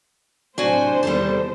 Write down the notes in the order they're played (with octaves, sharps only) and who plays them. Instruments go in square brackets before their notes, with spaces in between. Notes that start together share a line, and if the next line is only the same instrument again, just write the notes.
[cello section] A2 C3 F#3 [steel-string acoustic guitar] D4 F#4 G#5 [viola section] C5
[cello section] E2 C3 D#3 [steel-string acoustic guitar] G3 A4 A5